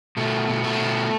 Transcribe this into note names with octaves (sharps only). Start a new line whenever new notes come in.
B2 A3
B2
A3
B2